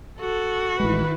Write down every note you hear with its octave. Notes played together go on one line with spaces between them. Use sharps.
F#4 A4
A1 D#3 G#3 E4 B4